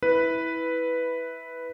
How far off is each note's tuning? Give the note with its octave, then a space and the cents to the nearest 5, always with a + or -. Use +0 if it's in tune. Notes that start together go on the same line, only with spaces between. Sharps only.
E4 -10 B4 +0